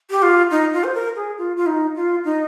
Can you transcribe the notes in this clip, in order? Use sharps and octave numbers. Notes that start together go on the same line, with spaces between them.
G4
F4
D#4
F4
C5
A#4
G#4
F4
F4
D#4
F4
D#4